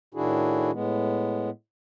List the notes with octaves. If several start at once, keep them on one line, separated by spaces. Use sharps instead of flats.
A2 D#3 D4 E4 F#4 G#4
A2 G#3 B3